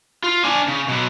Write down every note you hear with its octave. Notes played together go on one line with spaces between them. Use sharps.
F4
D4 G#5
C#3
B2 F#3